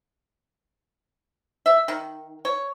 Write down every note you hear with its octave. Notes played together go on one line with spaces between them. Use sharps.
E5
D#3
C#5